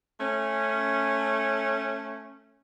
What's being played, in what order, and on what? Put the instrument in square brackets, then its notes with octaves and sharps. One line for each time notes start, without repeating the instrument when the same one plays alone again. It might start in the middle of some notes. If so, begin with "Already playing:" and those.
[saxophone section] A3 C#4